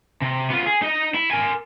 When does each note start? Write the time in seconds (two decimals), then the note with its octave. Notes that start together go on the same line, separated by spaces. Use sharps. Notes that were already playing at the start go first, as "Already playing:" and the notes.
0.22 C3
0.50 B3 F4
0.66 G#4
0.82 D#4 D#5
1.15 E4
1.31 A#4 G#5